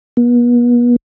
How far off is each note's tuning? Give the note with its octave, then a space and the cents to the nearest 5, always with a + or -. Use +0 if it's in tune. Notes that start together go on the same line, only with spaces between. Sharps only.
B3 -40